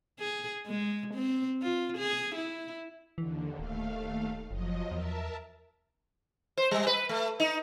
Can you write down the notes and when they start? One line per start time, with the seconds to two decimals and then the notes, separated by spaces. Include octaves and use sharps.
0.20 G#4
0.67 G#3
1.14 C4
1.62 F4
1.98 G#4
2.36 E4
3.18 D#2 D3 E3
3.59 D1 D#2 A3 F5
4.51 F#1 F3 F#3 D#5
4.91 E2 A#4 E5 A5
6.57 C5
6.71 G3
6.87 B4
7.09 A3
7.40 D#4